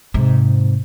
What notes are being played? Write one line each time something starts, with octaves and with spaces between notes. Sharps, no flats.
G#2 C3